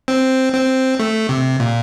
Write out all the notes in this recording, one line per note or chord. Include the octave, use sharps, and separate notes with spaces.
C4
C4
A3
C3
A#2